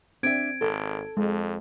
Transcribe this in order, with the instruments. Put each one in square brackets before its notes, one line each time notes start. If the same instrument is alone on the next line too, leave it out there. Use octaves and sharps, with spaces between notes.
[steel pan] C4 [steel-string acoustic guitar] D4 E5 [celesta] G#6 D7
[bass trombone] G#1 [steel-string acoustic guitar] A4
[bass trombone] F2 [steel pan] G#3